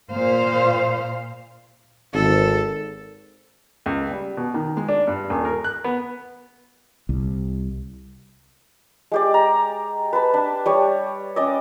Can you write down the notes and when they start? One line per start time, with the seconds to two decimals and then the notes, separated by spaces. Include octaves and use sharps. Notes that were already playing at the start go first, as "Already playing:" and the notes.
0.11 A#2 C5 F5
2.14 G#1 A4
3.86 C#2
4.11 G3
4.37 B2
4.54 D#3
4.77 G#3
4.88 D4
5.07 G2
5.30 D#1
5.45 A#4
5.64 F#6
5.84 B3
7.09 C2
9.12 G#3 G4 D5
9.34 A#5
10.13 B4 A5 B5
10.34 D4
10.66 G3 C#5
11.36 C#4 D5 D#5